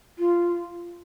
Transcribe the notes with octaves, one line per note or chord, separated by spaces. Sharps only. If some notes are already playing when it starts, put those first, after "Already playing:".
F4